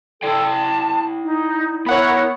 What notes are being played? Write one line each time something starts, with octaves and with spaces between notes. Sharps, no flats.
E4 A4 D5 G5 A5
A5
D#4
B3 E4 A#4 C#5 F#5 B5